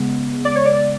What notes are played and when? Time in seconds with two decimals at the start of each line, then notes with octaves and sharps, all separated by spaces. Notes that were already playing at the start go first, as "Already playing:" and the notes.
Already playing: C#3 G#3 B3
0.45 D5
0.55 C#5
0.66 D5